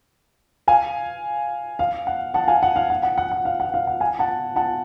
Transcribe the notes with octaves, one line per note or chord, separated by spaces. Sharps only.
F5 G#5
F5
F#5
F#5 A5
F5 G#5
F#5
F5
F#5
F#5
F#5
F#5
F5
F#5
F5
F#5
F5 G#5
F#5 A5
F#5 A5